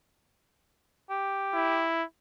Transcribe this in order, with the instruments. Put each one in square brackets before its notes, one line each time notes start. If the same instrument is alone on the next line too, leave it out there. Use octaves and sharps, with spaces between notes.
[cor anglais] G4
[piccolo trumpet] E4